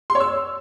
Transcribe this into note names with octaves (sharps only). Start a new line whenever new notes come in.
C6
C#5
E6